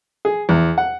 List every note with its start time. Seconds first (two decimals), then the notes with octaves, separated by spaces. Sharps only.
0.25 G#4
0.49 E2
0.78 F#5